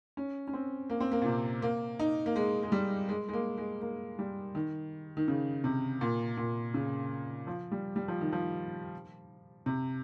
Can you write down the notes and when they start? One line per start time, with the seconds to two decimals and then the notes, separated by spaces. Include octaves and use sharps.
0.17 C#4
0.48 C#4
0.53 C4
0.90 A#3
1.00 C4
1.12 A#3
1.22 A#2
1.26 C3
1.62 A#3
1.99 D#4
2.26 A#3
2.36 G#3
2.63 G#3
2.72 G3
3.09 G#3
3.29 G#3
3.33 A#3
3.58 G#3
3.82 A#3
4.19 G3
4.55 D#3
5.17 D#3
5.28 C#3
5.64 C3
6.01 A#2
6.37 A#2
6.74 C#3
7.47 F3
7.72 G3
7.96 G3
8.08 F3
8.21 D#3
8.32 F3
9.66 C3